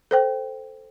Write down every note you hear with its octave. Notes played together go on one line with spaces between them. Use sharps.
A4 C5 G5